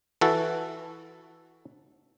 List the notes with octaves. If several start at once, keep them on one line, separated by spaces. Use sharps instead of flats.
E3 F#4 A4